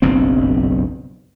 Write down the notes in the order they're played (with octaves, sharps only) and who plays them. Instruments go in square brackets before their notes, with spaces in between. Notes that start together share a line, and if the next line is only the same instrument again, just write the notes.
[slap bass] F#1 B1 G2 C4